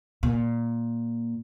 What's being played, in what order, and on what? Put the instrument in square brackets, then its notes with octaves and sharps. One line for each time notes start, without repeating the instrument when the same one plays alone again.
[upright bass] A#2